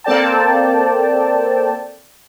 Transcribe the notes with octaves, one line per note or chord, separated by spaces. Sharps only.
A#3 C4 A4 D5 G5 A5